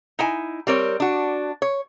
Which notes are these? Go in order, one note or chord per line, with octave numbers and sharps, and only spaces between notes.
D#4 E4 G#5
G3 C4 A#4 C#5
D4 F#4
C#5